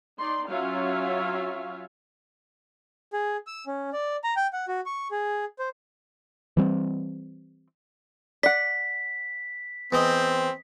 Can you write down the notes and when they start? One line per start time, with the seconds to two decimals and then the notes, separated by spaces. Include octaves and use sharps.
0.16 D#4 D5 C6
0.48 F#3 C#4 F4 C#5 E5 F5
3.13 G#4
3.47 E6
3.67 C#4
3.93 D5
4.24 A#5
4.36 G5
4.53 F#5
4.68 F#4
4.86 C#6
5.11 G#4
5.59 C5
6.57 E3 G3 C4
8.43 D5 F#5 B6
9.92 E2 C4 D#5